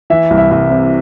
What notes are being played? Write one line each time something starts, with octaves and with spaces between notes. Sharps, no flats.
E3 E5
C2
E5
C2
C3